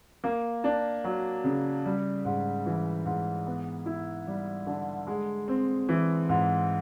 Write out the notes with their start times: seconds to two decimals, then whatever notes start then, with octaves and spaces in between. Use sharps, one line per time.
0.24 A#3
0.64 D4
1.04 F#3
1.44 C#3
1.85 G3
2.25 G#2
2.66 E3
3.05 G#2
3.46 B3
3.86 E4
4.27 G3
4.67 D3
5.07 G#3
5.48 C4
5.89 E3
6.29 G#2